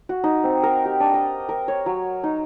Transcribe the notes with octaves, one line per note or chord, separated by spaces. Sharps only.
F#4
D#4
C4
A#4
G4
D4
D#5
A#4
C#5
F#3
D#4